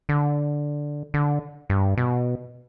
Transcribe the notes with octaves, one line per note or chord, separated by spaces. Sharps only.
D3
D3
G2
B2